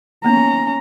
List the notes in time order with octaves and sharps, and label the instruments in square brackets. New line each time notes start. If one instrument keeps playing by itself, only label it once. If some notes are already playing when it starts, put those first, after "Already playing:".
[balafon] A#3 B3 [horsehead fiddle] C#4 A#5